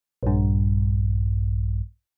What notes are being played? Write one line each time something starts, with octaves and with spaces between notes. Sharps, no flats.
A#1 G2